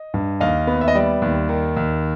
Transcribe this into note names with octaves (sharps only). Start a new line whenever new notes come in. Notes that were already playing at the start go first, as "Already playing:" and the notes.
Already playing: D#5
G2
D#2 D#5 F5
B3
E5
D#5
G3 D5 E5
D#2
D#3
D#2